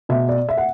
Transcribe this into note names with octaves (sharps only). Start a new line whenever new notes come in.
B2 E5
D5
E5
F#5